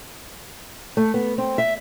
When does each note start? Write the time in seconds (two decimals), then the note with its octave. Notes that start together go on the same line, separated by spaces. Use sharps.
0.97 A3
1.14 B3
1.38 C4
1.58 E5